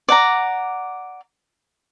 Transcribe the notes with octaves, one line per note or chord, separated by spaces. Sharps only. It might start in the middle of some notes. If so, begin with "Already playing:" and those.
D5 F#5 A#5